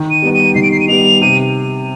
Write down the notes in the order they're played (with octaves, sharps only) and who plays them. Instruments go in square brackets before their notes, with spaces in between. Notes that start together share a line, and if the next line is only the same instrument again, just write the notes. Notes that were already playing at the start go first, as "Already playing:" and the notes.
Already playing: [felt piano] D#3
[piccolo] D#7
[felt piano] G3 B3 D#4
[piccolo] D#7
[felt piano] D#3 [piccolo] C7
[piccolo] D7
C7
D#7
[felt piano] G3 B3 D#4 [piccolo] F7
[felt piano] C3 [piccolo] D#7